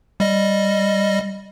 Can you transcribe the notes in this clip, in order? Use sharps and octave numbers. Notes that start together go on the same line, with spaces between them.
G3 D#5